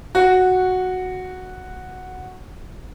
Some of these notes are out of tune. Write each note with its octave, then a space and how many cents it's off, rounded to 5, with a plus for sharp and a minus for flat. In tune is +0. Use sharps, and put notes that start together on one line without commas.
F#4 -5